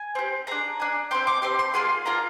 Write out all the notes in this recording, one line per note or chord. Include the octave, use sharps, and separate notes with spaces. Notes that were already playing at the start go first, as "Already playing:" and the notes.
Already playing: G#5
C4 G4
D4 G#4 A#5
D4 G#4
C4 G4 C6
D6
C4 G4 C6
C6
A#3 F4 G#4 C6
A#3 F4 G#4 A#5